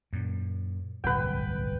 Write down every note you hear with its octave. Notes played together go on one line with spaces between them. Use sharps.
F#2 A#2
D1 G1 C2 B4 G5